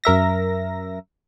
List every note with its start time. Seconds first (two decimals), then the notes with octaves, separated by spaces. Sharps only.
0.04 F#2 A#4 E5 A#6